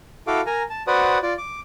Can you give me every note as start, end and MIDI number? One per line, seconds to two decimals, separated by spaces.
0.27 0.41 64
0.27 0.41 66
0.27 0.41 69
0.27 0.41 77
0.27 0.41 86
0.46 0.63 70
0.46 0.63 80
0.46 0.63 82
0.70 0.83 81
0.87 1.18 66
0.87 1.18 71
0.87 1.18 72
0.87 1.18 74
0.87 1.18 78
0.87 1.18 87
1.23 1.34 65
1.23 1.34 74
1.38 1.61 86